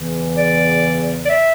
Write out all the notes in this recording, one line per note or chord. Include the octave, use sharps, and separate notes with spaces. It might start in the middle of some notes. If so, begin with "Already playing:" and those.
Already playing: E2 C#3 E3
D5
D5
E5